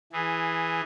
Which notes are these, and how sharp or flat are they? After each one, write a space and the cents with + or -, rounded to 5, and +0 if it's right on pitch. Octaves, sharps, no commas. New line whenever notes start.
E3 +0 G#4 +0